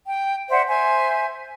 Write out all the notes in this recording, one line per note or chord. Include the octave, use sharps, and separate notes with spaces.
G5
C5 D5 E5 F#5
C5 E5 G#5